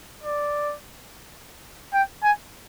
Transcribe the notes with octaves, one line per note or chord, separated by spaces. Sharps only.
D5
G5
G#5